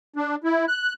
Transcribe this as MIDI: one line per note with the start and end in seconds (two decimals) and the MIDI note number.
0.16 0.36 62
0.44 0.65 64
0.68 0.93 90